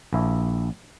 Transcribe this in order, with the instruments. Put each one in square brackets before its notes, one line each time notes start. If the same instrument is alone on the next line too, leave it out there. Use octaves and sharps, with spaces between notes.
[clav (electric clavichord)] A#1 E4